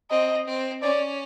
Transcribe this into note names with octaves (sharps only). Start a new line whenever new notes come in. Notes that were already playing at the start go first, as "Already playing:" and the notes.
C4 D#5
C4
C#4 D5